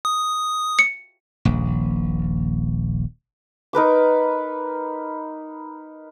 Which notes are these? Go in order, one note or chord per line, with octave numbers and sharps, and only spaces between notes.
D#6
C#7
D#1 A#1
D#4 A#4 B4 D6